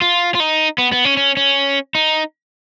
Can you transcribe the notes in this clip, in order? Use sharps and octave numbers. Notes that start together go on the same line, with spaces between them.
F4
F4
D#4
B3
B3
C#4
C#4
C#4
D#4